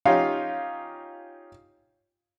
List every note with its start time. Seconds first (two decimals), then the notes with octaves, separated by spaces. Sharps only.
0.05 C#4 D#4 F4 G4 F5